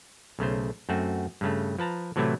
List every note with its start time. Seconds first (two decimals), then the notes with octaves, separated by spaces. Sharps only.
0.39 B1 C#3 A3 C5
0.89 F#2 A3 C4 F#4
1.41 G2 C#3 A3
1.79 F3 B4 A5 A#5
2.16 A2 C3 E3 F#3 A3 E4